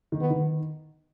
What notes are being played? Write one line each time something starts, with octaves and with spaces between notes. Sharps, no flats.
D#3
B3
D#3